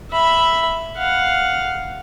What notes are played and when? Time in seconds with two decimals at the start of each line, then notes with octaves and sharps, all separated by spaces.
0.11 E5 B5
0.97 F5 F#5